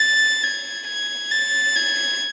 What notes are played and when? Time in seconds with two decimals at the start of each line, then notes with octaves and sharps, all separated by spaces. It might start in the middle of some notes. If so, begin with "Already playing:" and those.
Already playing: A6
0.43 G#6
0.87 G#6
1.31 A6
1.75 G#6